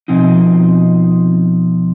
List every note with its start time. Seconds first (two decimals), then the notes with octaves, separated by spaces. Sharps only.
0.08 B2 F3 C4 D#4